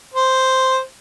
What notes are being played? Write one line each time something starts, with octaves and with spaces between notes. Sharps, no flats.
C5